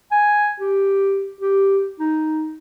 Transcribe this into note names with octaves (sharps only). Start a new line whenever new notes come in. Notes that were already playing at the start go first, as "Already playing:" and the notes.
G#5
G4
G4
D#4